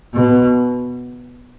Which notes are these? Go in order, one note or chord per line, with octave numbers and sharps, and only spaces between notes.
B2